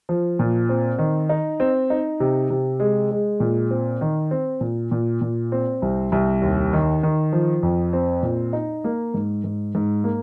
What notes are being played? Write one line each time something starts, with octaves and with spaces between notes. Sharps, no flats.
F3
A#2
C4
D#3
D#4
C4
D#4
C3
C3
G#3
G#3
A#2
C4
D#3
C4
A#2
A#2
A#2
C4
C2
C2
D#2
D#3
D#3
F3
F2
C4
A#2
D#4
A#3
G#2
G#2
G#2
A#3